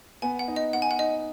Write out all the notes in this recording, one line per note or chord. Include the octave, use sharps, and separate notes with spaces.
B3 G#5
F#5
D#4
D#5
B3 F#5
G#5
F#5
D#4 D#5